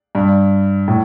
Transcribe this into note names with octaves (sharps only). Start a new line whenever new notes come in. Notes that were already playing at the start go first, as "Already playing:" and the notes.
G2
A2